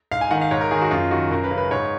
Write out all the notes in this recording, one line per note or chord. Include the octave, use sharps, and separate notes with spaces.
G#2 F5
G#5
D#3 F#5
F5
G#2 C#5
A#4
D#3 G#4
F#4
F#2 F4
D#3 F#4
F#2 A#4
B4
C#3
B4
G#2 C#5